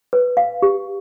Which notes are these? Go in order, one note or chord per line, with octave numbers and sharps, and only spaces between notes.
B4
F5
G4